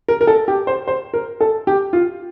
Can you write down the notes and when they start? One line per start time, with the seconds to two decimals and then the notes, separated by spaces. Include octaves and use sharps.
0.08 A#4
0.21 A#4
0.27 A4
0.48 G4
0.67 C5
0.88 C5
1.14 A#4
1.41 A4
1.67 G4
1.93 F4